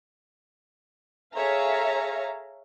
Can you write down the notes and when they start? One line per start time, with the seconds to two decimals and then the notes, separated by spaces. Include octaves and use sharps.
1.35 G#4 A4 C#5 E5 F5 A#5